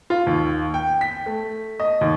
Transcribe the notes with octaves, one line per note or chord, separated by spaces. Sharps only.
F4
D#2
G5
B6
A3
D#5
D#2